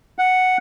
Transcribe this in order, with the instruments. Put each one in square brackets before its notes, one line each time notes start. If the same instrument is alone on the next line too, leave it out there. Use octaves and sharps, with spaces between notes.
[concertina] F#5